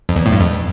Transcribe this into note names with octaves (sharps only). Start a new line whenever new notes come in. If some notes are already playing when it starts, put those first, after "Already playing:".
F2
E2
A2
G2
F2